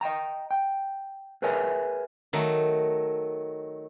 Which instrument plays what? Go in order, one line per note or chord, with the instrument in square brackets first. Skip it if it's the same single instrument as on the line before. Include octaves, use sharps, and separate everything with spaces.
[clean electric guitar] D#5 F5 G5 A#5
G5
G#4 A#4 B4 C#5 E5 G#5
[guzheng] D#3 F#3 A3